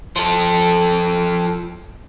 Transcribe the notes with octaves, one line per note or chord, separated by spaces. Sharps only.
F3 A4